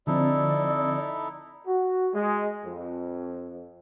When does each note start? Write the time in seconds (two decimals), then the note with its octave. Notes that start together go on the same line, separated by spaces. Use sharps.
0.07 D3 F3 C4 D#4 E4 A4 D5
1.67 F#4
2.14 G#3
2.65 F2